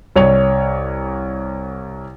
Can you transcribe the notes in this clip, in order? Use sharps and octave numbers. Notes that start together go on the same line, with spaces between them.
C2 C#5 F7